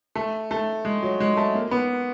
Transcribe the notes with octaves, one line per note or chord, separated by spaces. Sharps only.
A3
A3
G#3
F#3
G#3
A3
A#3
B3